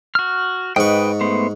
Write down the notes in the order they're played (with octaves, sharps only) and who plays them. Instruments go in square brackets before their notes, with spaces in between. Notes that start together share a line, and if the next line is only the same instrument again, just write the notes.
[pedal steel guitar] F#4 F6
[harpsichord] G#2 C#6 [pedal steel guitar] B4 D#5 G5
[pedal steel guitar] A3 B3 C5